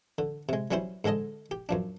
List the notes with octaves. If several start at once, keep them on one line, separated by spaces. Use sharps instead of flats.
D3
C3 G#3
F#3 G3 C#4 E4 C5
G#2 D3 G#3 A4 D#5
G4
F#2 F3 D4